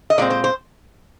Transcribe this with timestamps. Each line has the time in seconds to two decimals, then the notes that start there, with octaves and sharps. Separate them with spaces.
0.10 D#5
0.18 A#2 G#3 C4 D5
0.30 C5
0.44 C5